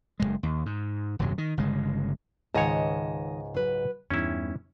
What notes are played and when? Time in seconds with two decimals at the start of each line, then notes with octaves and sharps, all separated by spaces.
0.20 F#1 E2 G#3
0.43 D#2
0.66 G#2
1.19 D#1 F#2 C3 F#3
1.38 D#3
1.57 G1 C#3 G#3
2.55 C#2 G#2 D#3 C#5 D#5 A5
3.54 F#3 B4
4.10 E2 G2 C#4 D#4 E4